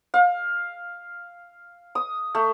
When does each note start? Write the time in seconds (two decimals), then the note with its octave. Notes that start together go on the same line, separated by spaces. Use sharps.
0.14 F5
1.95 D#6
2.35 A3